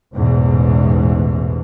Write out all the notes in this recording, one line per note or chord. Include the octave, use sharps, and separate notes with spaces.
A1 E2 G#2 B2